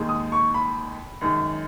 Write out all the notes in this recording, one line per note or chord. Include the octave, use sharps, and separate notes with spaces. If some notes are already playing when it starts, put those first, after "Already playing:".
Already playing: D#2 D#3 G#3
D#6
C#6
B5
F#2 D#3 G#3